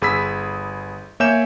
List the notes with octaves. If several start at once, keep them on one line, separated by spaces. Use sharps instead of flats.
G1 G#4 B5 E6 B6
A#3 C#5 E5 G#5 G6 E7